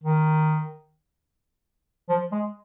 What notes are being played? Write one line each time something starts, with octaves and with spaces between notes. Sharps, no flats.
D#3
F3
G#3